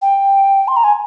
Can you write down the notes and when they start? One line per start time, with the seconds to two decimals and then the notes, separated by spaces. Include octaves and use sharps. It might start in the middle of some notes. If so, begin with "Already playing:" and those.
0.02 G5
0.68 C6
0.77 A#5
0.84 G#5